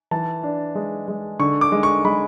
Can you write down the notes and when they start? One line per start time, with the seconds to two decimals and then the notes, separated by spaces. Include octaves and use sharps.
0.11 E3 A5
0.43 D4
0.75 G#3
1.08 G#3
1.39 D3 C#6
1.61 D6
1.72 G#3
1.83 C#6
2.05 G#3 B5